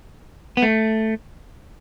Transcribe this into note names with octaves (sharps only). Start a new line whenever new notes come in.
B3
A3